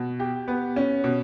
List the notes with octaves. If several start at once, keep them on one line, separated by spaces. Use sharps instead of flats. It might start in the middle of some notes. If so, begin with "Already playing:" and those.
Already playing: B2
G4
B3
C#4
B2